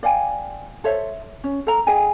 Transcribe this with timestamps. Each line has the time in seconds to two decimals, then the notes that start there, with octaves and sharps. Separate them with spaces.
0.03 D5 F5 G5 G#5
0.84 A4 C5 C#5 E5
1.44 C#4
1.67 A4 A#5
1.87 G#4 D#5 G5 G#5